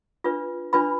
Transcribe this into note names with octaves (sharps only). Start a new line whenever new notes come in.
D4 F4 B4
D4 F4 B4 B5